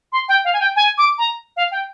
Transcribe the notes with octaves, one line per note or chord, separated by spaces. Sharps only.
C6
G5
F5
G#5
G5
G#5
D6
A#5
F5
G5